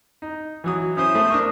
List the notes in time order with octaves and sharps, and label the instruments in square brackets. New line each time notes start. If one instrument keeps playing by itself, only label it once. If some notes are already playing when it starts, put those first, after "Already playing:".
[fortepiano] D#4
E3 F#3 D#6
[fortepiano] C#4 E4 C5 [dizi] D#6
[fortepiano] A3 C5 E5
D4 A#4 C#6